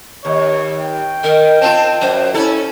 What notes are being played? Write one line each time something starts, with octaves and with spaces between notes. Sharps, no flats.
D#2 C#5
G5
D#3 A#4
C4 F4 A5
F#2 C5
C#4 E4 A4